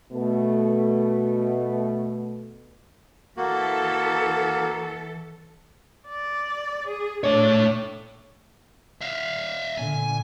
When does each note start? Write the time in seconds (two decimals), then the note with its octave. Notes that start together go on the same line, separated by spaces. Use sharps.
0.12 B2 A3
3.37 E3 A#3 F#4 A4
6.08 D5
6.87 G#4
7.24 A3 D4 C#5
9.02 E5 F5
9.78 A#2 D3 G#5